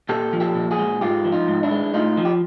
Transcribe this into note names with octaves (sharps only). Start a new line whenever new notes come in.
A#2 G4 A4
F3
G4 A4
A#2
F#4 G#4
G#3
G#2 F4 G4
F3
D#4 F4
G#2
D4 E4
G#3
A2 D#4 F4
F3
G4